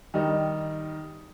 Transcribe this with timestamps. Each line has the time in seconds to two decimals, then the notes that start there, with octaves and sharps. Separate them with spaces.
0.14 D#3 G3 D#4